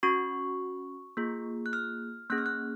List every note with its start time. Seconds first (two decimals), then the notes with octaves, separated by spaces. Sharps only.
0.03 C#4 F#4 C#6
1.17 A#3 F4 G#4
1.66 F#6
1.73 F6
2.30 A#3 C#4 G#4 F#6
2.38 F6
2.46 F#6